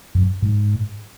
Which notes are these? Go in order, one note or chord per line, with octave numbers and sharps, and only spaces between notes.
F#2
G#2